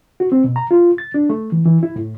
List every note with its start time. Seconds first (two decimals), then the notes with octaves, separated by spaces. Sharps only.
0.20 F#4
0.32 C4
0.44 B2
0.56 A#5
0.71 F4
0.98 A6
1.14 D4
1.30 A3
1.52 E3
1.65 E3
1.83 E4
1.96 A2